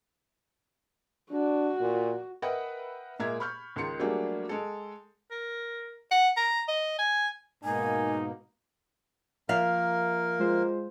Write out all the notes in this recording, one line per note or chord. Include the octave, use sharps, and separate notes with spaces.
D4 F#4
A#2
A#4 B4 D#5 E5 F#5 G5
A#2 G#3 A#3 E5 A#5 G#6
B5 C#6 F6 G6
C#2 D#3 D#4 C6 C#7
F#3 G3 A3 A#3 D4 G#4
G#3 A4
A#4
F#5
A#5
D#5
G#5
G#2 B2 A#3 D#4 G#5
F3 A#3 A#4 E5 F5
G#3 F4 C5